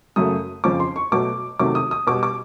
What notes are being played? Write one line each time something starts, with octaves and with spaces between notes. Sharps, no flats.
F#2 C#3 F#3 A3 D#6
F2 C#3 F3 D6
C6
C#6
B2 F#3 A3 D6
C3 D#3 F#3 A3 D6
D#6
D#6
B2 G3 D6
D6